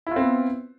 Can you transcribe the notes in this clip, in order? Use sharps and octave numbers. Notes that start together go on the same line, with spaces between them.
B3 C4 E4 F4